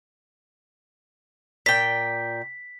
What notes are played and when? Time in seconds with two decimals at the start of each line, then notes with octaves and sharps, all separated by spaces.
1.66 A#2 G5 B6